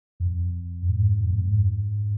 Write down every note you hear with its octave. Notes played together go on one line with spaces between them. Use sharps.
F2
G#2
F2
G#2